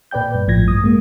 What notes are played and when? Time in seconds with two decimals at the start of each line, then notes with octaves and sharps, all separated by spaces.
0.11 A#2 B4 D5 G5 G6
0.35 G2
0.47 A#1 A2 F3 G#6 A#6
0.64 G2 D#6
0.84 G#3 A#3